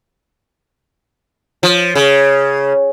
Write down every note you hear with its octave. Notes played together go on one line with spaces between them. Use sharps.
F3
C#3